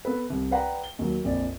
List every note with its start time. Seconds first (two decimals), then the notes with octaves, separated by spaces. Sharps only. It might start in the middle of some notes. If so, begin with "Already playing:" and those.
0.05 B3 A4 B4
0.30 C2 C3
0.51 B4 D5 F#5 G5 A#5 B5
0.84 G7
0.99 D#2 F#3
1.24 A#1 F2 D5